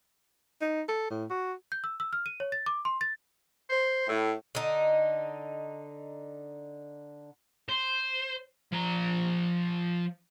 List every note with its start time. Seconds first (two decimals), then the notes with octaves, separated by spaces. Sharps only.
0.61 D#4
0.88 A4
1.11 A2
1.30 F#4
1.72 G6
1.84 E6
2.00 E6
2.13 F6
2.26 D#7
2.40 C#5
2.52 A6
2.66 D6
2.85 C6
3.01 A6
3.70 C5
4.08 A2
4.55 D3 D#4
7.69 C5
8.72 F3 A#5